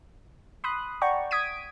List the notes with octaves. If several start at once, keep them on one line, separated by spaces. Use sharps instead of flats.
B5 C6 D#6 F#6
D5 F#5 G5 A#5 C#6
D#6 G#6 B6 D7 D#7